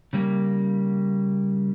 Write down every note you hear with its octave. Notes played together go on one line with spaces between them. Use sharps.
C#3 G3 A#3